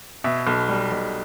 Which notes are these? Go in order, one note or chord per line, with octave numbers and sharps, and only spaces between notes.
B2 E5
B1
G3
B1